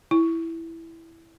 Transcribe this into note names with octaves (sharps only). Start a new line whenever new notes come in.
E4